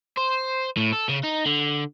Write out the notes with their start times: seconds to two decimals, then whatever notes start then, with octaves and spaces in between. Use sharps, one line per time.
0.17 C5
0.77 A2
0.92 A4
1.09 C#3
1.23 D#4
1.46 D3